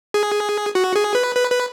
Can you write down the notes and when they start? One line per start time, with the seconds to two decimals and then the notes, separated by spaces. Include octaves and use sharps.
0.14 G#4
0.75 F#4
0.96 G#4
1.15 B4
1.36 B4
1.51 B4